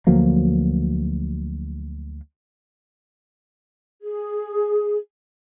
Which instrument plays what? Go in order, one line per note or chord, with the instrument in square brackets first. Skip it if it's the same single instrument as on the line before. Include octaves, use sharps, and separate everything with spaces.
[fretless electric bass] D2 F3 F#3 A#3
[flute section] G#4